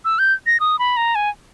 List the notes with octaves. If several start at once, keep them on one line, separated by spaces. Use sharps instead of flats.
E6
G6
A#6
D#6
B5
A#5
G#5